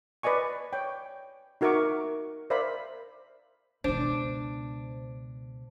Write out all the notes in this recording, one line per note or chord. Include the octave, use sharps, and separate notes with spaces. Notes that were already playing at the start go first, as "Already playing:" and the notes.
B4 D5 D#5 G#5 C#6
C#5 G5
D#4 F#4 A#4 E5 C#6 D6
A#4 C5 D5 E5 F5 B5
C#2 B2 D4 C5